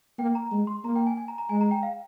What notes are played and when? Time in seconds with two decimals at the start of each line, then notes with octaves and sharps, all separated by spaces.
0.19 A#3 G5
0.35 A#5
0.51 G#3
0.67 C6
0.84 A#3 A#5
0.96 G5
1.07 G#5
1.17 G#5
1.28 A#5
1.38 A#5
1.49 G#3 G#5
1.61 A#5
1.71 G5
1.83 F5